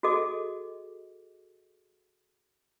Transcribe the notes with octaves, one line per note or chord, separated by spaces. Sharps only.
F#4 G#4 A4 D#5 D6